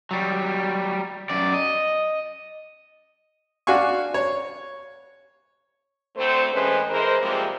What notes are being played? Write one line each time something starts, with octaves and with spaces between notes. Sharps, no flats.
F#3 G3
F#2 D5
D#5
D4 F#4 F5 G#5 C#6
C#5
D2 A3 C4 C5
A2 E3 G#3 C#4 B4 C5
E3 G#3 A#4 C5
C3 F3 G3 G#3 A#3 C4